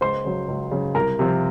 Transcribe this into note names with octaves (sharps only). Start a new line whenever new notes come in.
C#2 C5 C6
C#3 F#3
C#2
C#3 F#3
C2 A#4 A#5
C3 F3 C4